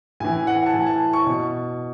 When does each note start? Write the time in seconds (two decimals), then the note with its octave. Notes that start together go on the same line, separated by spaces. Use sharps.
0.20 A2 E3 G#5
0.47 F#5
0.66 A5
0.73 A2 E3 G#5
0.87 A5
1.13 C#6
1.27 B2